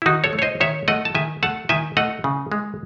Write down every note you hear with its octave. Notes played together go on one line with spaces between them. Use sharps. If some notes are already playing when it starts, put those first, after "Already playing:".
E4
D#3 D#4 F#4
A4 C#5
A3
C#5
C5 D#5
D#3 C#5 E5
A3 D#5 F#5
A5
D#3 E5 G#5
A3 F#5 A5
D#3 E5 G#5
A3 D#5 F#5
C#3
G#3